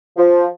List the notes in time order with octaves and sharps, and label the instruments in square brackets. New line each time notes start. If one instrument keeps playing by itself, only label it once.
[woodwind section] F3